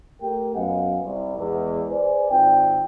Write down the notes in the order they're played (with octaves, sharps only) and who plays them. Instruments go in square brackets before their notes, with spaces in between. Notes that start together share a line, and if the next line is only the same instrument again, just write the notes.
[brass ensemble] A3 G4 A#4 G5
F#2 B3 D#5 F5 F#5 G#5
C2
E2 G#3
G#4 B4 C5 D5 G#5
G#1 C4 F4 D5 G5